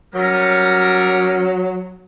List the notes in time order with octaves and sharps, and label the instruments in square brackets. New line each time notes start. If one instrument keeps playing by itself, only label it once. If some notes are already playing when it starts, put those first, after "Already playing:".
[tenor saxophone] F#3 [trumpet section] G3 C#4 A#4